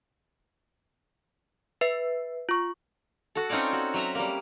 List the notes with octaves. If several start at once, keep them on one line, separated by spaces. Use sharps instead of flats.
B4 E5 C7
F4 C#6
F#4 A4
C4 C#4 D#4 F4 C#5 D5
F#4
F#3 E5 A#5
G3 A#3